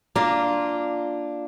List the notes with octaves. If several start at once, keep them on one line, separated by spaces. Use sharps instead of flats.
A#3 D4 F4